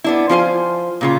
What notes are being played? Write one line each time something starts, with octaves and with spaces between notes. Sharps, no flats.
B3 D4 E4
F3 F4 C5 G#5
A#2 C#3 F4